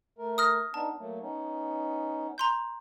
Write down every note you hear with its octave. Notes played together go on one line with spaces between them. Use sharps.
A3 A#4
D#6 F6 A#6
B3 D4 D#4 A5
F#3 A3 A#3
B3 C#4 D#4
A#5 C6 G6